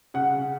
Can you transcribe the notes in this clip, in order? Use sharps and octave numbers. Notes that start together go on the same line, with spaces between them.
C#3 F#5